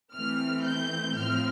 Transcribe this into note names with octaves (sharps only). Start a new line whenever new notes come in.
E3 A3 C4 F6
G6
A2 F3 C4 F6